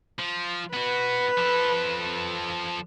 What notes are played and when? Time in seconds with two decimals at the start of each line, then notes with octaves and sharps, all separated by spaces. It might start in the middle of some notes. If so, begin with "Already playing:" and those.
0.19 F3
0.73 B3 F#4 B4
1.38 F3 A4